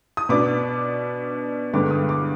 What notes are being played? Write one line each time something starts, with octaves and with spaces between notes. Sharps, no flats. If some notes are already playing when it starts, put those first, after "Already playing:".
D#6
B2 B3 D4 D6
G2 D3 G#3 B3 D6
D#6
D6